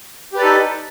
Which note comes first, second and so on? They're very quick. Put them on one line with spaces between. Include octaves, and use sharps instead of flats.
G4 B4 D5 A4 D#4